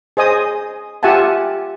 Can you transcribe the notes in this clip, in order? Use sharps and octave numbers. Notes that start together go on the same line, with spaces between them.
G#4 C5 D#5 G#5 D#6
F4 G4 E5 F#5 G#5 A5